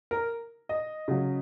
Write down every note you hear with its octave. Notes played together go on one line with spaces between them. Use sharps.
A#4
D#5
C#3 F#3